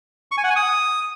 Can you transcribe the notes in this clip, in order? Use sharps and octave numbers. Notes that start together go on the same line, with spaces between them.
C#6
G#5
F#5
G#5
D#6